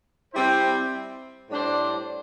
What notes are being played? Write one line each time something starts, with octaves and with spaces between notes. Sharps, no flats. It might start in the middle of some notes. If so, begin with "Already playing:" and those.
G3 C4 E4 C5
A2 G3 D4 C5